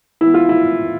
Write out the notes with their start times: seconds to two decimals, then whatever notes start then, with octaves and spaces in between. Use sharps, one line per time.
0.21 E3 B3 E4
0.34 F4
0.49 E4